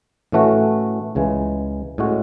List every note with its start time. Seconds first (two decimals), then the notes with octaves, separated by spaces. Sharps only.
0.32 A2 E3 A3 C#4 F#4
1.15 C#2 C#3 E3 G#3
1.98 A2 G#3 C#4 F#4